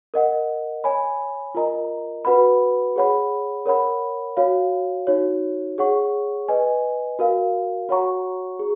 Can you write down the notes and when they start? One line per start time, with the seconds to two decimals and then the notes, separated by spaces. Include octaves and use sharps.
0.14 A#4 D#5 F#5
0.84 C#5 G#5 B5
1.55 F4 A#4 D#5 A#5
2.25 F#4 B4 F#5 B5
2.96 G#4 C#5 F#5 B5
3.66 A#4 C#5 F#5 B5
4.37 F#4 C#5 F5
5.07 D#4 F#4 C#5
5.78 G#4 C#5 F#5 C#6
6.48 B4 D#5 G#5
7.19 F#4 A#4 F5
7.89 F#4 C#5 F#5 A#5 C#6
8.59 G#4